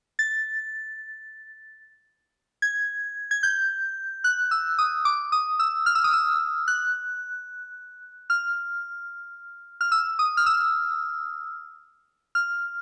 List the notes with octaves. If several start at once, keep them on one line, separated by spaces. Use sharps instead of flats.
A6
G#6
G#6
G6
F#6
E6
D#6
D6
D#6
E6
F6
E6
D#6
E6
F#6
F6
F6
E6
D#6
F6
E6
F6